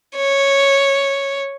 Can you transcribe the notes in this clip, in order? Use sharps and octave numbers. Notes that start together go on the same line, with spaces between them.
C#5